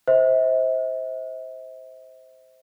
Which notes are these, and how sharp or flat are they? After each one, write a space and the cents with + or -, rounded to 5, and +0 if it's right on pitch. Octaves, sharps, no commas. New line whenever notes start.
C5 +0 E5 -40